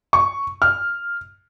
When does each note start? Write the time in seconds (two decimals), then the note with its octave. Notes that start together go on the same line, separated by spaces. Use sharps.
0.13 C#6
0.62 F6